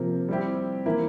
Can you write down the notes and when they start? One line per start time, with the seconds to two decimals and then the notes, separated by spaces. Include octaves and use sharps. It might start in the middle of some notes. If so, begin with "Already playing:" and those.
Already playing: C3 F3 A#3
0.28 G3 C4 E4 G4
0.86 E3 A#3 E4